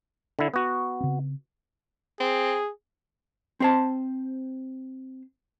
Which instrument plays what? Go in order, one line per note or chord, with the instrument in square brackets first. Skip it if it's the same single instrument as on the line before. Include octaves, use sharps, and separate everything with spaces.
[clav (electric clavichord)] D3 E4
B3 F#4
[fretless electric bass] C#3 C4
[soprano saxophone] C4 [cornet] G#4
[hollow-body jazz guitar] C4 C5 A5